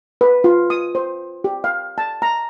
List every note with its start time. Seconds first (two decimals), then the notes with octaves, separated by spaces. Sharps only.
0.21 B4
0.44 F4
0.70 D#6
0.95 C5
1.44 G4
1.64 F5
1.98 A5
2.22 A#5